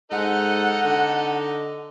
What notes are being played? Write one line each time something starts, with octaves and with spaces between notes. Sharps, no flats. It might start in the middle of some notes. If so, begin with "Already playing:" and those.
G#2 D#4 A4 D#5 F#5
D3